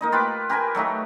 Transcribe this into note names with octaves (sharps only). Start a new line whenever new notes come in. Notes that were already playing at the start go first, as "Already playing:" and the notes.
A#3 D#4 D#5
F4 G4 B4 D6
G4 A#4 B4 G#5
F#3 A3 D#4 G4